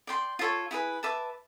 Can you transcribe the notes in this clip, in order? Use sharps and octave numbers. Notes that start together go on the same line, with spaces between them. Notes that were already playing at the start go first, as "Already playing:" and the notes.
D5 G5 C6
F4 A4 C#5
E4 G#4 B4
B4 E5 A5 D6